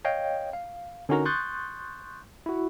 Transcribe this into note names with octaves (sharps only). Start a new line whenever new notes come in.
C#5 D#5 F5 G5
F5
D3 C#4 D#4 F#4 A#4 A#5
C6 C#6 D#6 F#6 G6 A6
E4 F#4